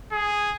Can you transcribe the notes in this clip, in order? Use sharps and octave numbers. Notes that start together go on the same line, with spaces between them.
G#4